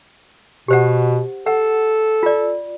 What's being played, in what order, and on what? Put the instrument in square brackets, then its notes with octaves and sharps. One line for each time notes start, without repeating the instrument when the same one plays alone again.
[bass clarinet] B2 [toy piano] G4 C5 F#5
[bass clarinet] A4 [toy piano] F#5
[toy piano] F4 D5